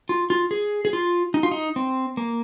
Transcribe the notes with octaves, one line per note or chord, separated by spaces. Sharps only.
F4
F4
G#4
G#4
F4
D#4
F4
D#4
C4
A#3